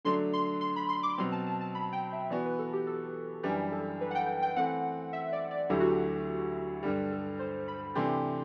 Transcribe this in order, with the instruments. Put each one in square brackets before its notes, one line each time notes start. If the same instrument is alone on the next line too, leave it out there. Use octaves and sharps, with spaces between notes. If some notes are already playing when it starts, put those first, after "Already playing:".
[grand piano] D3 F#3 A3 D4 [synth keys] C6
[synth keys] C6
C6
B5
C6
D6
[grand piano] B2 F#3 C4 [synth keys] C6
[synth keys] A5
A5
A5
B5
G5
E5
[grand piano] E3 B3 F#4 [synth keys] D5
[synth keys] B4
A4
G4
A4
[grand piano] F#2 E3 G3 D4 G4 [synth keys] B4
[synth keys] A4
B4
F#5
G5
G5
[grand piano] E3 A3 C4 [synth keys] F#5
[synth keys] E5
D5
D5
[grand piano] D2 D3 F#3 A3 E4 [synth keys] G4
[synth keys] F#4
G4
[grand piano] G2 D3 G3 [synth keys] G4
[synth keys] A4
C5
B5
[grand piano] C3 E3 A3 D4 G4 [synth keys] C6